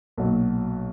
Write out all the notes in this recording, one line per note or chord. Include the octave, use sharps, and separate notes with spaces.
B1 A#2 F#3